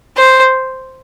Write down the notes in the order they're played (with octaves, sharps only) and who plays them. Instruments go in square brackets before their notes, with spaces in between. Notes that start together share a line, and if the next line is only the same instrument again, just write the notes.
[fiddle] C5